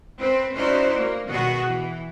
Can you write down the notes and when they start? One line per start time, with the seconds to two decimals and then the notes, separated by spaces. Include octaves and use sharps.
0.18 C4 B4
0.54 C#4 D#4 E4 F#4 C5 D5
0.96 A#3
1.28 B2 D#3 B3 F#4 G#4
1.65 E3